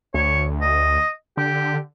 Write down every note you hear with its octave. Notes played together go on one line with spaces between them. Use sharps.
D2 C#5
D#5
D3 G4